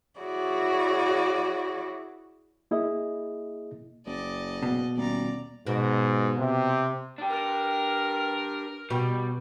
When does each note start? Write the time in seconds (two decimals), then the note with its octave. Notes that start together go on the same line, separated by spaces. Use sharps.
0.20 E4 F#4 G#4 C#5 D5
2.71 A#3 E4 G#4 D#5
4.06 F#1 D5 D#5
4.63 B2
4.97 D#1 D5 A#5
5.67 G#2 B2
6.38 C3
7.18 D4 G4
7.30 A#4
8.90 B2 G3